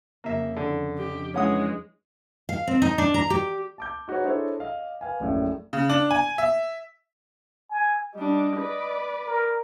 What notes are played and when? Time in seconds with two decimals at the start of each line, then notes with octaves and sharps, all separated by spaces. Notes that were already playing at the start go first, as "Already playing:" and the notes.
0.24 F2 C#3 A#3 E5
0.56 D3
0.98 F3 D4 D#4 G4
1.34 E3 G#3 C#4 F#5 D#6
2.49 F5
2.67 C4
2.82 D#4
2.98 D4
3.14 A#5
3.30 G4
3.78 A5 D6 G6
4.08 D#4 F#4 G#4 B4 C#5
4.24 D4 E4 G#4 A4 C5 C#5
4.60 D#5 F5
5.01 B4 F5 G5 G#5
5.20 A#1 F#2 A2
5.73 C#3
5.89 D4
6.11 G#5
6.38 E5
7.70 G#5
8.15 G3 D4 D#5
8.57 B4 D5
9.27 A#4